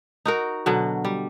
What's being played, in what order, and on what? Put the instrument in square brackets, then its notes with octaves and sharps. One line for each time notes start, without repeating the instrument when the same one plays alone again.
[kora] D#4 F#4 A#4
B2 D3 F#3
G3